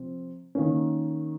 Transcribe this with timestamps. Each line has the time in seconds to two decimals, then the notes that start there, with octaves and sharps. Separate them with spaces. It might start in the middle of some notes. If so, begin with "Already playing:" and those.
Already playing: C3 F3 C4
0.55 D#3 A#3 C#4